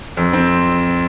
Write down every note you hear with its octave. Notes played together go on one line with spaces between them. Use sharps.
F2
C4